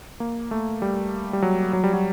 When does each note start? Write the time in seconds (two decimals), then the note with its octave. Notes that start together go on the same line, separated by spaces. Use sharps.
0.20 A#3
0.51 A3
0.82 G3
1.33 G3
1.42 F#3
1.73 F#3
1.84 G3
1.93 F#3